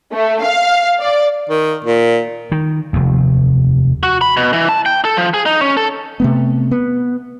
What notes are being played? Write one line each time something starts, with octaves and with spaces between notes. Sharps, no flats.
A3
F5
D5
D#3
A#2
D#3
F1 D#2
F#4
B5
B2
E3
A5
G5
A4
F3
G#4
D#4
C#4
A4
C3 A3 B3
B3